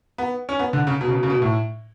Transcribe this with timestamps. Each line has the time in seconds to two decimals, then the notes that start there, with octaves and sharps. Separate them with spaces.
0.18 B3
0.49 C#4
0.59 B3
0.73 D3
0.87 C#3
1.01 B2
1.08 C#3
1.15 B2
1.23 C#3
1.30 B2
1.42 A2